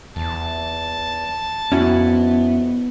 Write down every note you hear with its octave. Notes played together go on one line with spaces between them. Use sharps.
E2 A5
F2 B3 C#4 E4 F#4